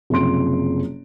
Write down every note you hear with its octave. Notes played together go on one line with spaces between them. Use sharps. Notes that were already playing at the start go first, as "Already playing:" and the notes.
F#1 C3 F3 C6 D7